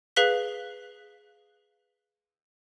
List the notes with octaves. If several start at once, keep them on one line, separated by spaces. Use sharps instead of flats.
G#4 B4 F5 F#6 B6 G7